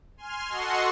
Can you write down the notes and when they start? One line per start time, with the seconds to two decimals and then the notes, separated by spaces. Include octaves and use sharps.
0.17 G#5 C6 F6
0.48 F#4 A4 D#5 F#5 C6 C#6